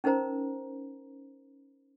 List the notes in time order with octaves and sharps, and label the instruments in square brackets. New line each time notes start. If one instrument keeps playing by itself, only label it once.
[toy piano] C#4 D#4 A#4 C5 A#5